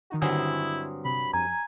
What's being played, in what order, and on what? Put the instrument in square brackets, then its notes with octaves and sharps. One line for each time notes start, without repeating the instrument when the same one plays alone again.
[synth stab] D#3 D#4 F#4
[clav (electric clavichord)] G2 F#3 C4 [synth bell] D3 G#5 D#6 [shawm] E4
[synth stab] C3 [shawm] B5
[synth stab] F2 D#7 [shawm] G#5 [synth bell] A#5